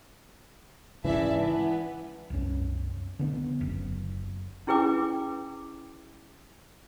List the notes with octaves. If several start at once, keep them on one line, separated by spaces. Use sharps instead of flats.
G#2 C#3 E3 D5 E5 A5
E3 B3
C2 F#2 C#4
D3 A3 B3
F#1 F#2
C#4 E4 G#4 B4 G5 D6